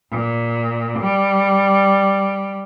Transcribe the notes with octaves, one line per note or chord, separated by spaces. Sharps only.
A#2
G3